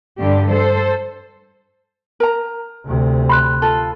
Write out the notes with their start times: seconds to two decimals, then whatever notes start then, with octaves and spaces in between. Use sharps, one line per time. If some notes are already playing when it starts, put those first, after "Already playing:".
0.19 G2 D3 G4
0.51 A4 C5
2.20 A#4 A#5
2.86 D2 C3
3.29 B5 C6 F#6
3.62 F4 A4